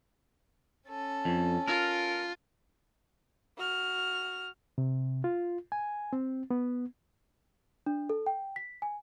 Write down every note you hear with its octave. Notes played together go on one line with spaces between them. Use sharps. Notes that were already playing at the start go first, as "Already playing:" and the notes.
C#4 A4
F2
F4 A#4
F#4 F6
C3
F4
G#5
C4
B3
D4
A4
G5
B6
G#5